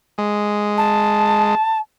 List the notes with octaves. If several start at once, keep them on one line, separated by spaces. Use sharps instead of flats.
G#3
A5